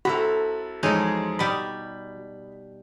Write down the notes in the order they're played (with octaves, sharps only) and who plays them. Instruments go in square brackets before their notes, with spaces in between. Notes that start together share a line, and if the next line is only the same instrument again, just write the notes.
[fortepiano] C2 B5 [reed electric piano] F#4 [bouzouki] A4 A#5
[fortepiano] E2 G#3 C#4 [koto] F3 D#4
[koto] B2 G3 [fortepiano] B5 D#6